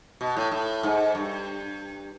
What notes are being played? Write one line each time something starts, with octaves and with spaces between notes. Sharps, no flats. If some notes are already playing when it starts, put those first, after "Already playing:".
B2
A2
A2
G#2
G2